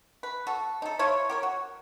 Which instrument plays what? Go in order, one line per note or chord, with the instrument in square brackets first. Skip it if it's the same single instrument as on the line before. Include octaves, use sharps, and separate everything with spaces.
[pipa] B4
F#4 A4
D#4 A4
E4 F4 C#5
G4 A#4 C#5
F#4